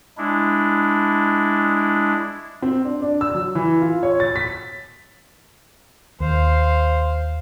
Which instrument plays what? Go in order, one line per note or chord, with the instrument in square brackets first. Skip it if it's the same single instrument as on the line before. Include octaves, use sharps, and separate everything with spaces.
[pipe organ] G#3 D4 E4
[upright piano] C4
D4
D4
E6
F#3
E3
F4
C#5
A6
B6
[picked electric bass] D#2 [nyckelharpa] C5 F5